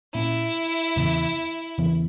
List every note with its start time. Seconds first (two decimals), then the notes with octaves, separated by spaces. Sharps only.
0.14 A#2 A#3 C#4 E4
0.96 E2 C#3 E3 B3
1.78 E2 C#3 E3 B3